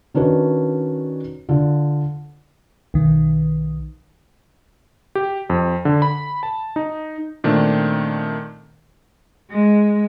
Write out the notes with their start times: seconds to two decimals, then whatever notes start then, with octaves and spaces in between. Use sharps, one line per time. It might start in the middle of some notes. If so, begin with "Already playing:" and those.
0.14 D#3 C#4 D4 F#4 B4
1.49 D3 F4
2.94 B1 D#3
5.15 G4
5.50 F2
5.85 D3
6.02 B5
6.43 A5
6.76 D#4
7.44 A#2 D#3 A3 C4 D4
9.51 G#3